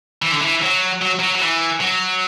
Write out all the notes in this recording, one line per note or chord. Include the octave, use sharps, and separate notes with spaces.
E3
D3
E3
F#3
F#3
F#3
F#3
E3
F#3